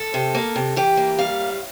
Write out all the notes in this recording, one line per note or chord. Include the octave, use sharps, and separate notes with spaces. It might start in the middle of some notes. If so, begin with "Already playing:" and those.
Already playing: A4
C3
A#3
C3
E3 G4
A#3
G3 F5
A2